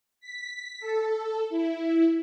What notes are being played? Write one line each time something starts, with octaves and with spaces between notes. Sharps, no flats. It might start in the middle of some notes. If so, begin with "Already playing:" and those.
B6
A4
E4